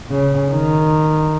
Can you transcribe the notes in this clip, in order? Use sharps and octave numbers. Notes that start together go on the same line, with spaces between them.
C#3
D#3